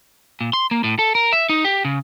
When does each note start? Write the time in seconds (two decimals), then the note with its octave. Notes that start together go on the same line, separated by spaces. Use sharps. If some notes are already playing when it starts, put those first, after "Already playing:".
0.41 A#2
0.53 C6
0.71 A#3
0.84 A2
0.99 A4
1.15 A#4
1.33 E5
1.49 D#4
1.65 G4
1.85 C#3